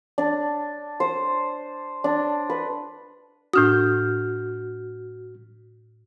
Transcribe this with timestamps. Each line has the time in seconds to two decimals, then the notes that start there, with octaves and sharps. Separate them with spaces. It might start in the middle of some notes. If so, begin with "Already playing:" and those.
0.18 D4
1.00 C5
2.04 D4
2.50 B4
3.53 A2 D4 F#4 D#6 F6 G6